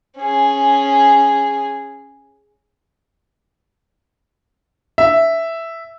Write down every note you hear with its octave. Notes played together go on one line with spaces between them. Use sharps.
C#4 G#4
E5